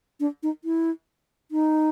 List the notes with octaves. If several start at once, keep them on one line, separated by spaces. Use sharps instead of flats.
D4
D#4
E4
D#4